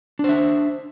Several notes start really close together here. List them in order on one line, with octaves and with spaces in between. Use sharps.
D4 C5 E5